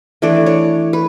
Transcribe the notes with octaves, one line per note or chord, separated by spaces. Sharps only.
E3 A3 D4 D5
C#5
B4